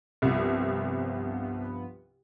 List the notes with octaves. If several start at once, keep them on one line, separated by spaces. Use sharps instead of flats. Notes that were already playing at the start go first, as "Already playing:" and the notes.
C2 G2 F3 B3